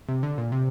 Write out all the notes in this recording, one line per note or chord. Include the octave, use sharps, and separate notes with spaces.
C3
D3
A#2
C3